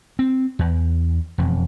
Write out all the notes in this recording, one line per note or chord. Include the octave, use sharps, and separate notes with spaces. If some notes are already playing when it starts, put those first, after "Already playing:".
C4
E2
E1 F2